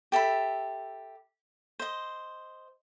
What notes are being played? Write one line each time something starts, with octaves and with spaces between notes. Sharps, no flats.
G4 A4 E5 B5
C5 D#5